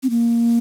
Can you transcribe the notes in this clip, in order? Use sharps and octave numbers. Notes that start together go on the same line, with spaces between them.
C4
A#3